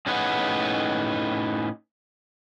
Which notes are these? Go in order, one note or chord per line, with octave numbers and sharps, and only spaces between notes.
A2 C#4 D#4 G#4 B4 F#5